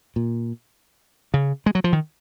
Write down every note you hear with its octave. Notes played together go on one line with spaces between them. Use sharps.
A#2
C#3
G#3
F#3
F3
D#3